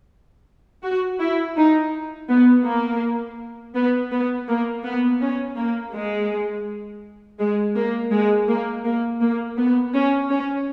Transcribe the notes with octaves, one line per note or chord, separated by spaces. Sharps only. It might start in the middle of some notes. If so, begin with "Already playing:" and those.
F#4
E4
D#4
B3
A#3
B3
B3
A#3
B3
C#4
A#3
G#3
G#3
A#3
G#3
A#3
A#3
A#3
B3
C#4
C#4